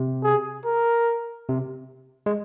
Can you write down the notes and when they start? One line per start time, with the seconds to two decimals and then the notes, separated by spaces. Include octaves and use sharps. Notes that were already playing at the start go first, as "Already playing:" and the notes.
Already playing: C3
0.24 G#4
0.65 A#4
1.49 C3
2.26 G#3